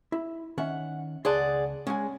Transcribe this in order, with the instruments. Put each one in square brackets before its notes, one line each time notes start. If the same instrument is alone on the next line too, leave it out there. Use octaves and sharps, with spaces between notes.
[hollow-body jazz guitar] E4
[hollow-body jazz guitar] D#3 C#4 E5 [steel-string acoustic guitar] F#5
[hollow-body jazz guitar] C#2 A5 C6 [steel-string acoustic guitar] G#4 D5 F#5
[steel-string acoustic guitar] G#3 [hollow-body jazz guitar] C#4 F#5 G#5